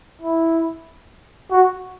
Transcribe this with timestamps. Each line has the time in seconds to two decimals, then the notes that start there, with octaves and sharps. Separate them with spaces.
0.21 E4
1.51 F#4